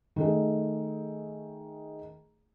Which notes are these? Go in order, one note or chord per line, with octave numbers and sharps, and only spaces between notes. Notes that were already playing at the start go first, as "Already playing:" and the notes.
D#3 A3 G#4